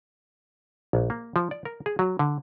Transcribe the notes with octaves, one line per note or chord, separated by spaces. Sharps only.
A#1
A#3
F3
D5
A#4
G#4
F#3
D3